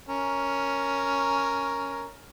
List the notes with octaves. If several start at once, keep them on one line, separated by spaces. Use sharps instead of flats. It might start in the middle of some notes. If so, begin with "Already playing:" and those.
C#4 A#4